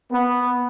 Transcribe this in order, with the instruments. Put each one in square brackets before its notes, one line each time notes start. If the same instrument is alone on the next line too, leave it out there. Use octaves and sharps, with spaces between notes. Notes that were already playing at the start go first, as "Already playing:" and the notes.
[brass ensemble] B3